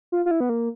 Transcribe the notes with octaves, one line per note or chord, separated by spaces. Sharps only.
F4
F4
E4
B3
A#3